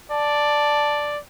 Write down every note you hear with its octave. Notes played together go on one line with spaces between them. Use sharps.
D5 A5